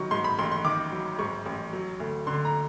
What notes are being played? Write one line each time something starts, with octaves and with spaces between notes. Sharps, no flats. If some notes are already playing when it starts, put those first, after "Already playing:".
Already playing: D#3 F#3 C#6
G#2 C6
B5
A1 C6
C6
D#3 D6
F#3
G#2 C#6
A1
F#3
D2
D3 C6
A#5